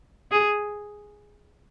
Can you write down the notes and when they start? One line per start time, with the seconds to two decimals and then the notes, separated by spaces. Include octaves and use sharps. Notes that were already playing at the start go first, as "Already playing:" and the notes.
0.31 G#4